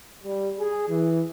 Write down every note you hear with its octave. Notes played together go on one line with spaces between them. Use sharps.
G3
G#4
E3